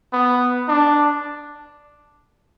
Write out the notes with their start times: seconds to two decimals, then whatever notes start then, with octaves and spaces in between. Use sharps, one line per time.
0.13 B3
0.68 D4